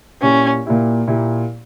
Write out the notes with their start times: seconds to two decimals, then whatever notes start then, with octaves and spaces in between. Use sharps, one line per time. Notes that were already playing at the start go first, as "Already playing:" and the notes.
0.22 A#2 A#3 C#4 E4 G4
0.66 A#2 A#3 E4 G4
1.08 A#2 A#3 E4 G4